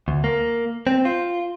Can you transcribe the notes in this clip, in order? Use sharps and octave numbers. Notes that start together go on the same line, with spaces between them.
D2
A#3
C4
F4